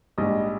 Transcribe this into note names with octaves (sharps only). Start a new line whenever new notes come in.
A#1 G#2 G3 D#5